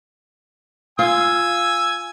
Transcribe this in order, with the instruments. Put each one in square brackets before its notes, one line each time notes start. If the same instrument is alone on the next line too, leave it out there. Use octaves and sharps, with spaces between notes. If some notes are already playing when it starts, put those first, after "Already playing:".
[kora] F4 [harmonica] G#5 E6